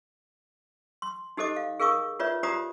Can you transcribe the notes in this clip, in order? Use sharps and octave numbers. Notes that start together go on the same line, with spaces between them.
C6
D#4 G4 A4 C5 D#5 D6
F5
G#4 A#4 F5 C#6 D#6
F4 B4 C#5 D5 E5
F4 G4 C5 D5 A#5 D#6